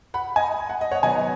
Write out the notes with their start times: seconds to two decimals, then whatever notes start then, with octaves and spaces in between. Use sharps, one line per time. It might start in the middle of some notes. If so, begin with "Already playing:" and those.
0.14 F#5 B5
0.36 D#5 G#5
0.70 F#5
0.81 D#5
0.91 C#5 F#5
1.03 D#3 F#3 B3 D#4 D#5 G#5